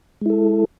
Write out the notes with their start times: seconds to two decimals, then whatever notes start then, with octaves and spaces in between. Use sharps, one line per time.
0.21 G#3
0.26 E4
0.30 A4